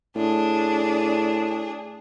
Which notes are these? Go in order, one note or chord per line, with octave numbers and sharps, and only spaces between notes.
A2 D4 G#4